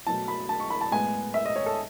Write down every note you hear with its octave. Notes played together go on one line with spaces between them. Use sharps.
B2 F#3 A3 A5
B5
A5
C#6
B5
A5
A2 G#3 B3 G#5
E5
D#5
C#5
A4